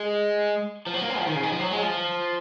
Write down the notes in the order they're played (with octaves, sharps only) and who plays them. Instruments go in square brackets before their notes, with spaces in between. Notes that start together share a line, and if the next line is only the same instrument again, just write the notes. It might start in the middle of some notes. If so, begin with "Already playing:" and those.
Already playing: [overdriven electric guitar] G#3
F3
F#3
A#3
C4
F3
D#3
C#3
D#3
F3
F#3
G#3
F3